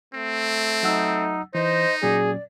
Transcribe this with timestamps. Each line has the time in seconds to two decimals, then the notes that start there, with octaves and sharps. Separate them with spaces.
0.14 A3 C4
0.83 F#3 D#4 F#5 E6
1.55 E3 D#4 C5 D#5
2.03 A#2 F#3 C#4 G#4 D5